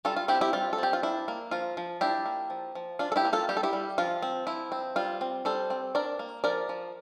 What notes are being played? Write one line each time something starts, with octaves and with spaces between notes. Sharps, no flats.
G3 F4 A4
F4
C4 E4 G4
E4 G4
G3 F4
A4
C4 G4
F4
D4 E4
A#3
F3 F4
F3
D4 E4 G4
A#3
F3
F3
D4 F4
A4
E4 G4
A#3
F4 A4
G3 G4
A4
E4 G4
G3
F3 F4
C4
F3 E4
C4
G3 F4
C4
G3 A4 C5
C4
D4 A#4 D5
A#3
F3 A#4 D5
F3